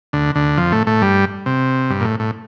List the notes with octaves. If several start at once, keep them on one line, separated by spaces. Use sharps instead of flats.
D2 D3
D2 D3
F2 F3
A2 A3
A2 A3
G2 G3
C3
G2
A#2
A2
A2